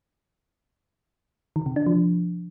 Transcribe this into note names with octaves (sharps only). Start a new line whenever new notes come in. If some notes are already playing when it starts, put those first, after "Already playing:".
D#3
C3
D4
F3